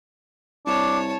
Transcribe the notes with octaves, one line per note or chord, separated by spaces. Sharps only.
C2 D4 C#5 A5